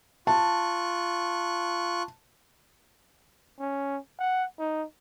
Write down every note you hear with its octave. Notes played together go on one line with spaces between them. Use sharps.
F4 A5 C#6 F#6
C#4
F#5
D#4